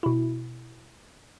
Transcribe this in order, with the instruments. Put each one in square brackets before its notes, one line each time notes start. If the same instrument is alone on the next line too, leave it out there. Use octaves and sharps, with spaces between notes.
[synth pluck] B2 E4